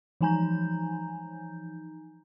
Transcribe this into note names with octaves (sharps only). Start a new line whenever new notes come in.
E3 F3 D#4 G#5 A#5 G6